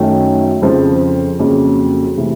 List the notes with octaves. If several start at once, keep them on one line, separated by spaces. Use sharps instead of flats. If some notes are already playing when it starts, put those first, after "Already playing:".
Already playing: F#2 D#3 F#3 A3 C#4
F2 C#3 F3
F2 C#3 F#3 A#3
C3 E3 A3